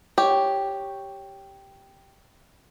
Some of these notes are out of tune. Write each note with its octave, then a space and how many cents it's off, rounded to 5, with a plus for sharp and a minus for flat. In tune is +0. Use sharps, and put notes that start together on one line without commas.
G4 +0 C#5 +0